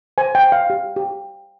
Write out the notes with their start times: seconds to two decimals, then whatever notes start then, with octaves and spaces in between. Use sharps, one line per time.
0.18 C5 G#5
0.35 G5
0.43 C5
0.52 F5
0.70 G4
0.96 G4